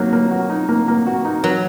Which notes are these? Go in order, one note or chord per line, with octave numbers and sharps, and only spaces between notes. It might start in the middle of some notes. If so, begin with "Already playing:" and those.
Already playing: F#3 A#3 D#4 F#4
A#3
F#4
D#4
A#3
A#3
F#4
D#4
F#3 A#4